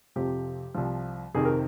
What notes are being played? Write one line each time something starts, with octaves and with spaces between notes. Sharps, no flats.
F2 C3 F3 G4
C2 C3 F3
F2 C3 D#3 G#4
A#4